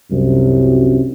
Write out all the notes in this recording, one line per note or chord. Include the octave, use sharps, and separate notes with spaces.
C2 F#2